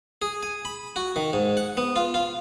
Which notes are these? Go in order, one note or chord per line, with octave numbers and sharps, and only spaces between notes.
G#4
G#5
B5
F#4
D#3
G#2
F#5
B3
F4
F4